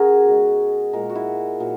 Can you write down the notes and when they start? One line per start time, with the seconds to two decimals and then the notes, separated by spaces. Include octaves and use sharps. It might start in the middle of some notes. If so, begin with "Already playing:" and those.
Already playing: C#3 F#4 G#4 A#4
0.25 B2 G#3
0.93 A#2 G#3 A#4
1.10 F#4
1.15 E4
1.60 A#2 F#3